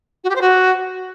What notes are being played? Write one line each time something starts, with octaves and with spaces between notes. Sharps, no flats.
F#4
G4
C5
F#4